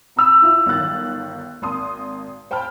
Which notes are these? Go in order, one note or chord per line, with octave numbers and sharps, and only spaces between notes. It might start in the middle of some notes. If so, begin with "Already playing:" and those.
C4 A#5 B5 E6 F7
E4 F4
G1 D#3 F#3 F#6 A6
G#1 A#3 A5 C6 D#6
C5 G5 A5 B5 F6